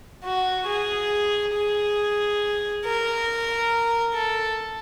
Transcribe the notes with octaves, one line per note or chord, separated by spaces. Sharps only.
F#4
G#4
G#4
A#4
A4